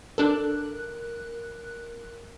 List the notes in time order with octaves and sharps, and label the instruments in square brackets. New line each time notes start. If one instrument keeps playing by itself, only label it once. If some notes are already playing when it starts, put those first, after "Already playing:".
[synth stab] D4 A4 [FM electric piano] A#4 F#6